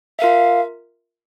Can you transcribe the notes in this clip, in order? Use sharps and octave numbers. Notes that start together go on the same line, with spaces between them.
F4 A#4 E5 F5